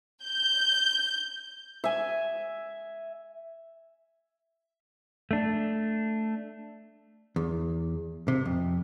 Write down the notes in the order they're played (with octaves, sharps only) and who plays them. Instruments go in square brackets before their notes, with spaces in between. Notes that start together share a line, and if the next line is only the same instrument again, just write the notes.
[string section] G6
[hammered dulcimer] E5 G#5
[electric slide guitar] A3 D4
[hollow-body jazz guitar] E2
C3
F2